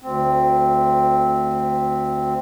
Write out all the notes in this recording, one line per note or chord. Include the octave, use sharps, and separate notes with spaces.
D2 C4